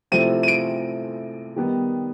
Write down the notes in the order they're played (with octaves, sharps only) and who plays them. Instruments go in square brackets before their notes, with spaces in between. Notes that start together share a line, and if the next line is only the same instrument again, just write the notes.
[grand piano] C3 F3 A3 C4 E4 D#7
D#7
D7
D#3 G3 B3 D#4